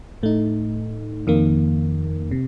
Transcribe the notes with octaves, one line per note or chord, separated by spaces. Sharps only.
A2 A3 D#4
F2 D#3 A#3
C3